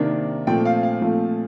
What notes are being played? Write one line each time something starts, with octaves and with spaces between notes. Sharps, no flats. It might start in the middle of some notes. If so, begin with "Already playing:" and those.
Already playing: C3 D#3 A#3 D4
A#2 F3 A3 C4 G5
F5
F5
A#2 F3 A3 C4